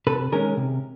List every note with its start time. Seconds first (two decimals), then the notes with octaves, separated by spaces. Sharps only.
0.07 C3 A4 B4
0.32 D#3 G#3 C#4 G#4 A#4
0.57 C3